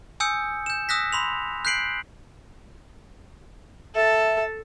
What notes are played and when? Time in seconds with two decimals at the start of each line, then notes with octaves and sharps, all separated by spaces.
0.20 G#5 D#6 E6 G6 C#7
0.66 G6 E7
0.89 D#6 E6 F#6 A#6 B6
1.12 B5 C6 F7
1.65 F#6 G6 B6 C7 D7 F#7
3.95 A4 E5 A5